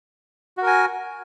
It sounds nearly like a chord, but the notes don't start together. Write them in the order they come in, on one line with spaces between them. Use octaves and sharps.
F#4 A#4 G#5